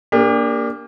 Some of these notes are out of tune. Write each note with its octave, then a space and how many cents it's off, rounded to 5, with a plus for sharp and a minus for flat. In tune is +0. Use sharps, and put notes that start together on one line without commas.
A#3 +5 D4 -10 G4 +40